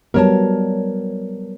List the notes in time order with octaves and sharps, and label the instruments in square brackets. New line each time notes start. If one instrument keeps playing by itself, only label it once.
[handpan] F#3 G3 B3 [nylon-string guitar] A#4 C#5 A5